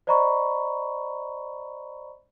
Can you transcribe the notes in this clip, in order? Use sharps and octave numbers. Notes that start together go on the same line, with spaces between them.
C5 D5 D#5 A#5 B5 C#6